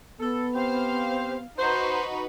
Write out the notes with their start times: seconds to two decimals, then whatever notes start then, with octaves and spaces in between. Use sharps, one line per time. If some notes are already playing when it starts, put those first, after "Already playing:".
0.20 B3 A4
0.55 C4 G4 C5 F5
1.59 D#4 F#4 B4 C5